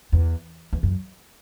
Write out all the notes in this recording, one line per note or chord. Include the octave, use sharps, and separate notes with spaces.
E2
E2
F#2